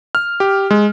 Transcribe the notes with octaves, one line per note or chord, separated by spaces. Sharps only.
F6
G4
G#3